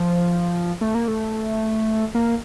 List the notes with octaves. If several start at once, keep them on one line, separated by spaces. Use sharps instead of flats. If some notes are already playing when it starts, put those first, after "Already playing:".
Already playing: F3
A3
A#3
A3
A#3